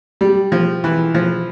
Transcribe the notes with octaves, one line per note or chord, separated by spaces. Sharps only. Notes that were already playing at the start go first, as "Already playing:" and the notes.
G3
F3
E3
F3